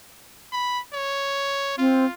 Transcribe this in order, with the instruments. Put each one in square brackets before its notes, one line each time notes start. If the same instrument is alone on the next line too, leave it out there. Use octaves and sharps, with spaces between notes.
[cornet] B5
C#5
[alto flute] C4 [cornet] F4